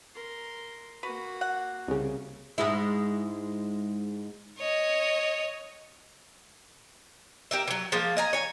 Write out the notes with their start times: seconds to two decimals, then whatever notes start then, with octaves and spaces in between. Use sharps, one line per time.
0.15 A#4 C6
1.03 A#3 F#4 B4
1.41 F#5
1.88 C2 C#3
2.58 G#2 G#3 E4
4.58 C#5 D#5
7.51 G4 A#4 E5
7.68 E3 F#3
7.92 F3 G#3 A#3
8.17 D#5 G#5 A#5
8.33 C#5 G#5